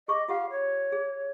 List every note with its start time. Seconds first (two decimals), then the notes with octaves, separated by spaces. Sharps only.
0.08 G#4 D#5 C#6 D6
0.28 F4 G4 F5 F#5
0.51 C#5
0.92 G#4